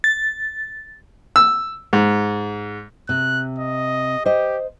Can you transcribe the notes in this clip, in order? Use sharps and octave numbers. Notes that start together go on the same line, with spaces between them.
A6
E6
G#2
C3 F#6
D#5
G4 C5 D#5